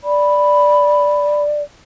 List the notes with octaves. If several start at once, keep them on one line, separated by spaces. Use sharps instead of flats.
D5 B5